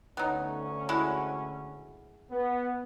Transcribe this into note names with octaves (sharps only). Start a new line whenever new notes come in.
D2 B3 C#4 D#4
G#3 E4 F#4
B3